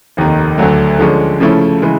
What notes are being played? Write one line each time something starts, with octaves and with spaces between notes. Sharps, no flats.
F1 D#2 D#3
D2 D3 F#3 A3
D3 F3 G#3 C#4
C#3 F3 A3 C#4 E4
C#3 E3 G#3